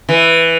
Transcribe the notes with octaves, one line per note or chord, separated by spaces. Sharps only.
E3